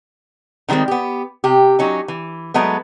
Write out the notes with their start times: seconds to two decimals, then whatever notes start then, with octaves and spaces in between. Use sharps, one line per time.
0.69 D3 D#3 G3 G#3 C4
0.88 B3 G4
1.44 C3 G4
1.79 F#3 C#4 D#4
2.08 E3
2.54 F#3 G#3 A3 B3